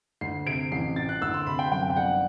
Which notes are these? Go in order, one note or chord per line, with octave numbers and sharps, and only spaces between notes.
D2 C7
C3 D7
A1 C7
A2 A6
F#6
D2 E6
C6
C3 B5
G5
F#2 G5
G5
G1 F#5